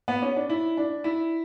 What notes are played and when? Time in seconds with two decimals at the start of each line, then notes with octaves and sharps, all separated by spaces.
0.08 B3
0.22 C#4
0.36 D4
0.50 E4
0.77 D4
1.04 E4